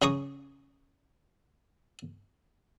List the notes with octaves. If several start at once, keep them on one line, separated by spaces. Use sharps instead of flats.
C#3 G#4 A#5 C#6 D#6